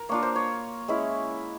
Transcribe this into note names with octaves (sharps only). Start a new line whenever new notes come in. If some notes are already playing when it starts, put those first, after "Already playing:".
Already playing: A#4
A#3 D4 F4 C#5
C5
C#5
G#3 C#4 E4